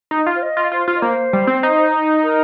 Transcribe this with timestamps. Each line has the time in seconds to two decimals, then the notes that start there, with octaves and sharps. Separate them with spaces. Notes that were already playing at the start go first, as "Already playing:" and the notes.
0.11 D#4
0.26 F4
0.36 C5
0.42 D#5
0.57 F4
0.72 F4 C5
0.88 F4
0.96 D#5
1.02 A#3 C5
1.33 G3
1.47 C4
1.63 D#4
2.23 A#4